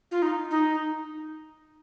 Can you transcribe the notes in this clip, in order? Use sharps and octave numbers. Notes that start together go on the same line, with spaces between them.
F4
D#4
D#4